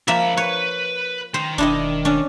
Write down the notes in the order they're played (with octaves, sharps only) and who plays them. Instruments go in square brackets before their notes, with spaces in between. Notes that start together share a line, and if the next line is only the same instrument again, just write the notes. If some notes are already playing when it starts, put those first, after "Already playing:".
[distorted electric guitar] C#2 B5 [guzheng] F3 A#3 E5
[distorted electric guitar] B4 [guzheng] C#5
[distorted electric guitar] D#3 [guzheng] C5
[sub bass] E1 [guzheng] D4 E4 D#5
[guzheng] C#4 D4